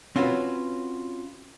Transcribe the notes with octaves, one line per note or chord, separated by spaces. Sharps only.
C4 C#4 F4 F#4 B4